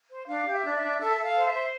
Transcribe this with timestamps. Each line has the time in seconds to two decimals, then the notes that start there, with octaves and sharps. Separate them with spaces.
0.10 C5
0.27 D4 F5
0.45 G4
0.52 E5
0.64 D4
0.76 E5
0.82 D4
0.99 A4 E5
1.17 A4
1.23 F5
1.36 C5
1.46 E5
1.54 C5